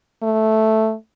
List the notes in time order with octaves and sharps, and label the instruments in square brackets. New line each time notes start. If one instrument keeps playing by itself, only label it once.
[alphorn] A3